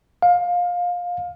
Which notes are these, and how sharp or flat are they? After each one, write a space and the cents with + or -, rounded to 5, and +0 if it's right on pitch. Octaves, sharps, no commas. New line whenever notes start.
F5 +20